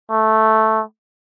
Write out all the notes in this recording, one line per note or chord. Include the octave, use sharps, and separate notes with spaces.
A3